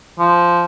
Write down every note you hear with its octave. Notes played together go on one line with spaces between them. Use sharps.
F3